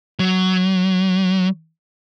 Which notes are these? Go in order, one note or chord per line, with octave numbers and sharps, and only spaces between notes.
F#3